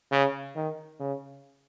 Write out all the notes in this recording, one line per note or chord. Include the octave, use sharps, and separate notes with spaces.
C#3
D#3
C#3